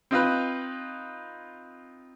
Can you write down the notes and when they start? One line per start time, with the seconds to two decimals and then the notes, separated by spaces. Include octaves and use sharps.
0.11 C4 D#4 F4 B4